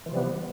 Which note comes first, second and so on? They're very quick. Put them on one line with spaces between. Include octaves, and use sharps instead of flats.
E3 F3 C3 G3 B3